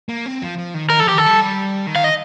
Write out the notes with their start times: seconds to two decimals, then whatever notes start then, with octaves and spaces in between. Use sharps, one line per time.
0.09 A#3
0.26 C4
0.42 F3
0.58 F3
0.74 D#3
0.90 D#3 A#4
1.00 F3 A4
1.09 G4
1.14 D#3 A4
1.26 G3
1.87 D#3
1.96 F5
2.04 D#5